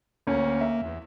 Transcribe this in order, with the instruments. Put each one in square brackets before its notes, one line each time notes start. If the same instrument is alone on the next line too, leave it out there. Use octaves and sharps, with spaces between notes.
[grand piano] D2 C#4 [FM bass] A#3
[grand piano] E5
[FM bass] E2